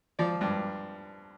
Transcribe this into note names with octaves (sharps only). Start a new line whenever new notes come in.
F3 D5
G2